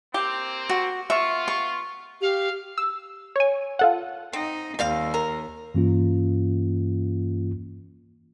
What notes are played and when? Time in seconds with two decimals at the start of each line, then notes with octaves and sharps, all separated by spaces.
0.14 A#3 C4 G4
0.69 F#4
1.10 B3 F4 E5 C#6
1.48 C#6
2.21 G4 F5
2.78 E6
3.36 C#5 G#5
3.79 F4 A4 F#5
4.33 C4 D#4
4.79 D#2 G3 C4 F5
5.14 A#4
5.74 G2 E3 A#3 C#4 F4